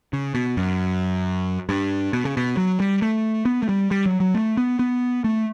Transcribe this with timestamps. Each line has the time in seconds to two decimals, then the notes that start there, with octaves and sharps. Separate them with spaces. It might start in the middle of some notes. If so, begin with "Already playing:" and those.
0.13 C#3
0.34 B2
0.57 F#2
1.69 G2
2.13 B2
2.25 C#3
2.37 B2
2.57 F#3
2.80 G3
3.02 A3
3.45 B3
3.63 A3
3.69 G3
3.91 G3
4.06 F#3
4.20 F#3
4.35 A3
4.57 B3
4.79 B3
5.24 A3